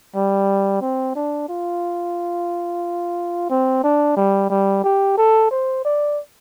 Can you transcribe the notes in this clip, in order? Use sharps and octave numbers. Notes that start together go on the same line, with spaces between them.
G3
C4
D4
F4
C4
D4
G3
G3
G4
A4
C5
D5